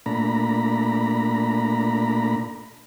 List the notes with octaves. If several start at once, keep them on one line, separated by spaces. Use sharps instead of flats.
A#2 A3 D4 A#5 B5